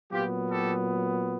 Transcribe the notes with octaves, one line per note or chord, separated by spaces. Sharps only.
A#2 F#3 B3 F4 G4
G4 A4